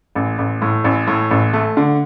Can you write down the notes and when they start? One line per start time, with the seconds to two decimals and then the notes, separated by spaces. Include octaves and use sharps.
0.15 A1
0.38 A1
0.62 A2
0.84 A1
1.07 A2
1.31 A1
1.53 A3
1.77 D3